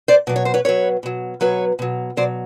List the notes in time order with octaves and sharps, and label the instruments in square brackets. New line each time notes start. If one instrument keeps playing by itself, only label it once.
[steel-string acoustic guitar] C5 D5
B2 F#3 D5
C#5
C5
B4 C#5
B2 F#3 B4 C#5
B2 F#3
B2 F#3 B4 C#5
B2 F#3
B2 F#3 C5 D5